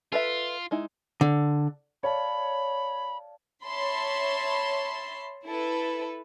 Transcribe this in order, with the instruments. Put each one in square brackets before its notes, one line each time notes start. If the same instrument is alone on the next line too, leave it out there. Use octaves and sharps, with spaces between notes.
[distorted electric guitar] F4 [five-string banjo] A4 B4 E5
[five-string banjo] G#3 D#4 E4
[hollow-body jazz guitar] D3
[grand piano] C#5 [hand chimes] D5 F5 A5 [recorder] B5
[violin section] C#5 E5 A5 B5 C6
E4 A4 B4